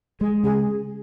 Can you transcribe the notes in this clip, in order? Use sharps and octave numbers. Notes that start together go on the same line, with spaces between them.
G#3 G#4
C#3 G#4